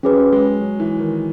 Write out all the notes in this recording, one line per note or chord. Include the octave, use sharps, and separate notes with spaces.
F#3 C#4 G#4 B4
G#3
F#3
E3
D#3